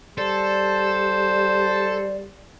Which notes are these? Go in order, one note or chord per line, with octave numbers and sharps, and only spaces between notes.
G3 A4 C5 D5